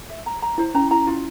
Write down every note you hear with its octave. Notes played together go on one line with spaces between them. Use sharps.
E5
A#5
A#5
E4 C5
C#4 A#5
E4 A#5
E4 F4